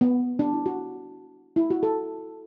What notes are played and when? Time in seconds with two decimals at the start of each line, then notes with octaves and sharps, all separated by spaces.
0.01 B3
0.39 D4
0.53 E4
0.66 F#4
1.56 E4
1.70 F#4
1.83 A4